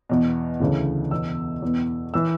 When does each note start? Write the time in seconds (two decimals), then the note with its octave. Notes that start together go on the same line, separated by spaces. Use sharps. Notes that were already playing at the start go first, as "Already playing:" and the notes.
0.09 E2 B2
0.60 D2 C#3 E3
1.11 E2 B2 E6
1.62 E2 B2
2.14 E3 E6